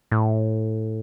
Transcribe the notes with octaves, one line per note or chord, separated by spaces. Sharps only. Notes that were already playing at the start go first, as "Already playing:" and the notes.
A2